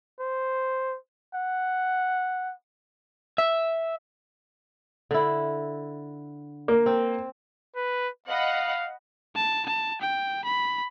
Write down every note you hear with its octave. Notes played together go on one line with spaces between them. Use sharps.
C5
F#5
E5
D3 E4
A#3
C4
B4
D#5 F5 F#5 B5
A5
A5
G5
B5